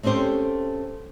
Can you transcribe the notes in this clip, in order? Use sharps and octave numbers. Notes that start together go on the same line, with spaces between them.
A3 C4 C#4 G4 C5